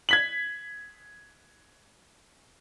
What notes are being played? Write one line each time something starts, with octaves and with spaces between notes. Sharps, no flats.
G#6 B6 F#7